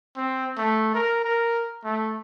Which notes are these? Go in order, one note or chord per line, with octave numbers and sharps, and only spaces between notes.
C4
A3
A#4
A#4
A3